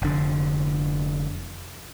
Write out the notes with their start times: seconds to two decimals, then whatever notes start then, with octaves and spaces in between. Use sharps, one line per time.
0.02 F1 D3